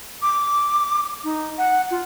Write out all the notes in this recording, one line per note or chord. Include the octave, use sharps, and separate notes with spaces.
D6
D#4
F#5
F4